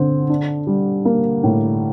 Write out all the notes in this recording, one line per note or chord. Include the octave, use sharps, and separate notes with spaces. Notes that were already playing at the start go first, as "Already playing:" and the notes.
Already playing: D3 C4
D4
G3
A#3
A2